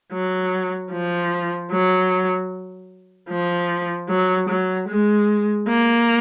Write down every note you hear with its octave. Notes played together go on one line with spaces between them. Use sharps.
F#3
F3
F#3
F3
F#3
F#3
G#3
A#3